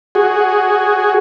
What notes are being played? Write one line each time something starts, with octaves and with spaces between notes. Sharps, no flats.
F#4 G#4